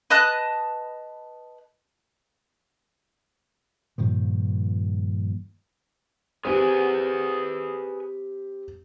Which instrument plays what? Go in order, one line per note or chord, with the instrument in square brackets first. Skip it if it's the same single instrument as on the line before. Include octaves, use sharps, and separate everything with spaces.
[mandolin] B4 D#5 A5 F#6
[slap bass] G2 A#2 D#3 F3
[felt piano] C4 G4 [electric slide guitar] G#4 B4 G#5